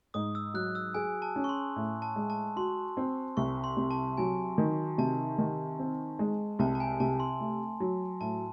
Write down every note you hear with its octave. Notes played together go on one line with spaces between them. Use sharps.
G#2 D#6
E6
F#3 F#6
E6
G#4 G#5
A5
C#4
C#6
C6
A2
A5
G#3
A5
F#4 C6
C4
C2 C#6
C6
C3
A5
F#3 G#5
D#3
C3 A5
D#3
C4
G#3
C2 A5
A5
G#5
C3 A5
C6
A3
F#3
A2 A5